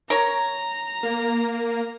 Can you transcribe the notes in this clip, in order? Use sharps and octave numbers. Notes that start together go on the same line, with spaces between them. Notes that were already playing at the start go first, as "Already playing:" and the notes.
A#4 C#5 A#5
A#3